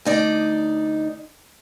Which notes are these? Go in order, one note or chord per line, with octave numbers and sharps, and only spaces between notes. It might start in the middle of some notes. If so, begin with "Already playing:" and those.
D2 D#4 D5